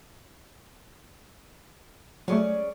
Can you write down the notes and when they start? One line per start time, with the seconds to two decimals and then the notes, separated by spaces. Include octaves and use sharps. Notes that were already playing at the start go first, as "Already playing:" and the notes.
2.28 F#3 G#3 A3 C#4 G#4 D5